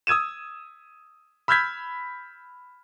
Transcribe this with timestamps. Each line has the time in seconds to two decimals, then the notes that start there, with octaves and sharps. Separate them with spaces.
0.07 D#6 E6 G#6 D#7 E7
1.48 B5 E6 F6 G6 G#6 B6